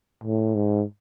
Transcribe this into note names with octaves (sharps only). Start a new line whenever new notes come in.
A2
G#2